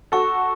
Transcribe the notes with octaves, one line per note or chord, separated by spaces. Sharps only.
F#4 A4 C#6